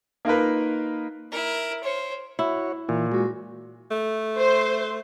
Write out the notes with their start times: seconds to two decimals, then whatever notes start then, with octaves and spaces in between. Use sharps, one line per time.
0.25 A#3 D#4 F4 A#4 B4
1.31 E4 A#4
1.83 C5 C#5
2.39 E4 F#4 C#5
2.89 A#2 E3
3.12 G#3 F#4
3.91 A3
4.39 C5